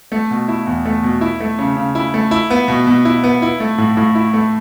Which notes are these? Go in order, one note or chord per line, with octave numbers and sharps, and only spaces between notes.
A3
B2
E4
E2
A3
B2
E4
A3
C#3
C#3
E4
A3
E4
B3
B2
B2
E4
B3
E4
A3
A2
A2
E4
A3